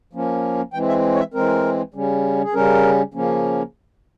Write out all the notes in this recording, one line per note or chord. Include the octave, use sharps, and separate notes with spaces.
F3 A#3 C#4
E3 G#3 C4 G5
E5
C#5
E5
E3 G#3 C4 A#4
C#3 G3 C#4
G#4
C#3 G3 C#4 A#4
C#3 F3 A#3 C#4